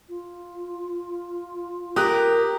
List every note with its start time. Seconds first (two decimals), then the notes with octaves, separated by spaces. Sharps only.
0.09 F4
1.96 G4 A#4 D#6 F#6